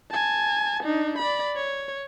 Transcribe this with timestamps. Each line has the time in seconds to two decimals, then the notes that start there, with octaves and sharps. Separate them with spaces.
0.11 G#5 A5
0.83 D4 D#4
1.18 D5 B5
1.56 C#5